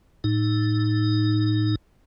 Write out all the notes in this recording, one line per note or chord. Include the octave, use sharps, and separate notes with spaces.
A2 D#4